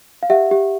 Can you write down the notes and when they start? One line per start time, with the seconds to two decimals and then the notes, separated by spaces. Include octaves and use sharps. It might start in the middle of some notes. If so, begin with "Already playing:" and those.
0.23 F5
0.30 G4 E5 F#5
0.51 G4